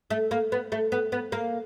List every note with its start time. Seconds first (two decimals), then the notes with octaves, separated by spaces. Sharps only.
0.10 A3
0.31 A#3
0.52 B3
0.72 A3
0.92 B3
1.12 B3
1.32 A#3